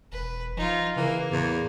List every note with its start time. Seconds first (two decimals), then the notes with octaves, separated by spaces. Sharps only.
0.12 E1 B4
0.57 F3 D#4 F4
0.96 C#3 E3 A#3
1.31 E2 A2